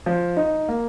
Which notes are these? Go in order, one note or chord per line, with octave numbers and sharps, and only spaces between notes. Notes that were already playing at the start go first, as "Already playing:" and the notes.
F3
D#4
A#3